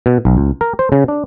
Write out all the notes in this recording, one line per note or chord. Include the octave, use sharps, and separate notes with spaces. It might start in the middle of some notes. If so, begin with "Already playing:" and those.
B2
B1
C#2
A#4
C5
C#3
D4